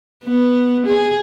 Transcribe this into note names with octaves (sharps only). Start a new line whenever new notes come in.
B3
G#4